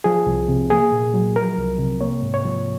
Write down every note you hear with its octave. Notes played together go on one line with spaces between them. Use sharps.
F3 G#4
C2
C3
A#3 G#4
A#2
F#3
F3 A#4
C2
C3
A#3 C#5
G#2
C#5
F3